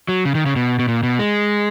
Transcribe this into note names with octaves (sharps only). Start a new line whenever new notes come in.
F#3
C#3
D#3
C#3
B2
B2
A#2
B2
G#3